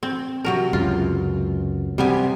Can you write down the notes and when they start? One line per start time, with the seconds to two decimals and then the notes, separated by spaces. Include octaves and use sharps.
0.03 C4
0.44 C3 F#3 A#4
0.73 C#2 F#2 F4
1.98 C3 G3 B3 G#5